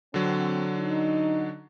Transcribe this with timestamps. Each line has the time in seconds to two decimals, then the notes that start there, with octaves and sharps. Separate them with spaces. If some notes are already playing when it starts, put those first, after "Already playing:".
0.14 D3 F#3 C4
0.77 D#4